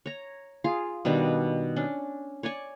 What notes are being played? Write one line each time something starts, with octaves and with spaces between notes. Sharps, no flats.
C#5 A#5
F4 G#4 F5
B2 D#3 G3 D4
C#4 D4
C#5 D5 G#5 C#6